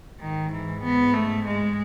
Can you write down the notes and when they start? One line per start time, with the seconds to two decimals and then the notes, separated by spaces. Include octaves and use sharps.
0.21 G#2 D#3
0.52 E3
0.84 B3
1.14 A3
1.45 G#3